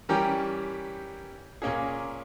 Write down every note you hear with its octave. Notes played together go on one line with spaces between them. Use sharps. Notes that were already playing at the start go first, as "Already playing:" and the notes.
E3 G3 C#4 G4 A#4
A#2 A#3 C#4 G#4